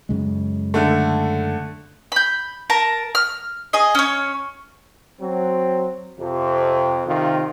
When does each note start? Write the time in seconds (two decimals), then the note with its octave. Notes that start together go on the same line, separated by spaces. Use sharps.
0.09 F#2 C#3 G#3
0.74 D3 A3
2.12 B5 G6
2.70 A#4 A5 A#5
3.15 F6
3.73 G#4 D#5
3.95 C#4 C#5
5.21 F#3 C4
6.19 F2 C3
7.06 C3 D#3 F4